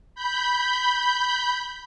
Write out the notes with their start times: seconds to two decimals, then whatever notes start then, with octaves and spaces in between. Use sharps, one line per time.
0.15 B5 G6